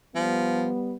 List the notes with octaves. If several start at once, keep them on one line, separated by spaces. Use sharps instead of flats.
F3 G3 B3